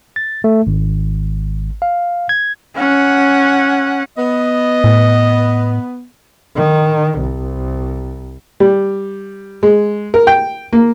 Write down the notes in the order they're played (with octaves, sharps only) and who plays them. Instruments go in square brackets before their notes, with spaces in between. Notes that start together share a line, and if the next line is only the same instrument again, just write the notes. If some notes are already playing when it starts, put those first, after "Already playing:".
[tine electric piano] A6
A3
G#1
F5
G#6
[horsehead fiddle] C#4 F#5
[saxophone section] B3 [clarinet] D#5
[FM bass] A2
[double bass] D#3
C2
[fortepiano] G3
G#3
A#4
G5
A#3